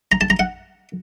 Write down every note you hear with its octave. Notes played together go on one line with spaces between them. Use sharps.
A#5
A5
A#5
F#5